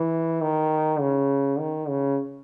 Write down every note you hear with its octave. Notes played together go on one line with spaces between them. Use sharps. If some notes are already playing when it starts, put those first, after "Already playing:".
Already playing: E3
D#3
C#3
D#3
C#3